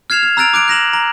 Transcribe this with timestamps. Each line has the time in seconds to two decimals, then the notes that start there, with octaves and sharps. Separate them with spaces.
0.10 F6 G#6 C7 E7 F7
0.23 F6
0.37 A#5 E6 F#6 A6 D7 F7
0.54 D6 F#6 D7
0.68 F#6 A#6 E7 F#7
0.93 A#5